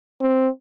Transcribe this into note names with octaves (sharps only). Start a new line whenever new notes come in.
C4